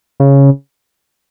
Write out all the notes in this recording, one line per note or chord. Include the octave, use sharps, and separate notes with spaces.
C#3